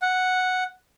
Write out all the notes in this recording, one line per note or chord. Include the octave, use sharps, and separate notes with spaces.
F#5